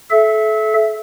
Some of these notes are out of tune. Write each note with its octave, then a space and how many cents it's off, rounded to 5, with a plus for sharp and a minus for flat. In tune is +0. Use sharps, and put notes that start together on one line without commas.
A4 -30 E5 +5